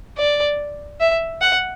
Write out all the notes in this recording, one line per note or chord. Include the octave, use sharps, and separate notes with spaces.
D5
E5
F#5